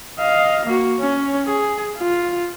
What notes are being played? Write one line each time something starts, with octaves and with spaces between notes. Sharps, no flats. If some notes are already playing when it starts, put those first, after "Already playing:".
D#5 F5
A#3 F#4
C#4
G#4
F4